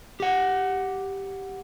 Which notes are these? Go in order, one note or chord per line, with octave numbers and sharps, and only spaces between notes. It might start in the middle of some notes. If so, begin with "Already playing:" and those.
G4 F#5